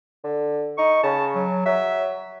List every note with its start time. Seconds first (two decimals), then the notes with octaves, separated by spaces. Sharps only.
0.24 D3
0.78 D#4 C#6
1.03 C#3 A5
1.35 F#3
1.66 F#3 E5